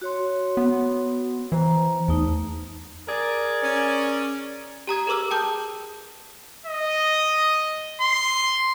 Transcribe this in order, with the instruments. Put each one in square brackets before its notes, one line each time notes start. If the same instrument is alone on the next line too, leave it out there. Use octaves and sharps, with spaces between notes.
[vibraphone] F#4 C#5 C6
[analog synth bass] B3
[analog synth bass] E3 [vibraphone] C5 A#5
[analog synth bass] E2 [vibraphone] A3 D#4
[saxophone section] G#4 A#4 D5
[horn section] C#4
[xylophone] G4 A#5 D#6 G#6
G#4 A#4 B4 D6 E6 F6
G5 A5 D#6 G6
[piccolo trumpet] D#5
C6